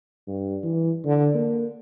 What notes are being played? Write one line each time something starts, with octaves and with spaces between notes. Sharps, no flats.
G2
E3
D3
A#3